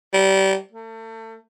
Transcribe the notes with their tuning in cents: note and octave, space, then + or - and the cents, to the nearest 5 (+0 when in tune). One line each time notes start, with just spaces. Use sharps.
G3 -25
A3 +35